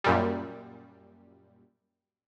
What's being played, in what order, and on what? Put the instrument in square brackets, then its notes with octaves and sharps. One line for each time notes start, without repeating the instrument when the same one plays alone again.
[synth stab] F#2 A#2 G3